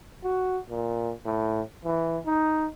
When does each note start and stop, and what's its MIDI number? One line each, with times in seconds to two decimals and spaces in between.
0.24 0.58 66
0.70 1.12 46
1.25 1.61 45
1.84 2.18 52
2.26 2.66 63